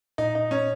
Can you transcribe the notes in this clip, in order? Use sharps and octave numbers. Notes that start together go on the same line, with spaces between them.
A#2 D#4
D#4
C#4